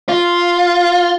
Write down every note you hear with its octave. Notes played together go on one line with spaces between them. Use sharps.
F4